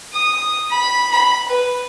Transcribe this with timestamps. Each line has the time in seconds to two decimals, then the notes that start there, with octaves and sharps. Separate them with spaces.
0.13 D#6
0.71 B5
1.12 B5
1.48 B4